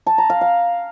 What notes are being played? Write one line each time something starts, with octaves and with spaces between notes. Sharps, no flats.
A5
A#5
F5
F5